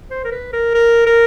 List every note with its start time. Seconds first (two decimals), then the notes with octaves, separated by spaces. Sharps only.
0.10 C5
0.24 A#4
0.31 B4
0.53 A#4
0.74 A#4
1.06 A#4